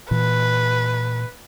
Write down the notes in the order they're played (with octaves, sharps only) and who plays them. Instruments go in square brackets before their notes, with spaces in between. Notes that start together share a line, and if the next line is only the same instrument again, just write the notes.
[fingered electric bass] A#2 E3 [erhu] B4